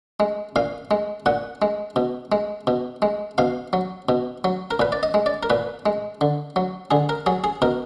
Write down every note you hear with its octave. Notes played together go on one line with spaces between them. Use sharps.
G#3
A#2 F5
G#3
A#2 F#5
G#3
B2
G#3
B2
G#3
B2 F5
F#3
B2
F#3
A#4
A#2 B4
D5
D#5
G#3
D5
A#4
A#2 B4
G#3
D3
F#3
D3 G#4
A#4
F#3 G#4
G#4
B2 A#4